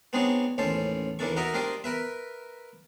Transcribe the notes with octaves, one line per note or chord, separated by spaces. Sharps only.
B3 C4 D4 D#4 G#4 C#5
A1 D#2 C#4 A4 C5 A5
D#2 E3 A#3 D4 A4 C#6
D#4 F#4 A#4 D#5 E5 A#5
D4 F4 G4 A#4 C5 D#5
A#4 B4 E5